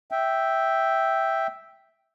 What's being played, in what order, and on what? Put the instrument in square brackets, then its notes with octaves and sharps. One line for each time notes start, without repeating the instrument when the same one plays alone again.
[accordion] E5 G5